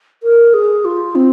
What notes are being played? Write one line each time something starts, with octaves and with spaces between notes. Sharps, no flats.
A#4
G#4
F4
C4